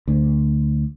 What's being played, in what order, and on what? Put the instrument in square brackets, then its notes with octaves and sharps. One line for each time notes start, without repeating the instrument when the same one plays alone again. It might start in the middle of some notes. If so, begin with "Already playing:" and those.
[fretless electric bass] D2